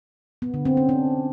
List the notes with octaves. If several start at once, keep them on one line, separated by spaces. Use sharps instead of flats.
B3
D3
C4
C#4
D4